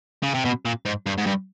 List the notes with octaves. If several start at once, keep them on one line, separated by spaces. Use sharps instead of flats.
C#3
C3
B2
A#2
G#2
G2
G#2
G2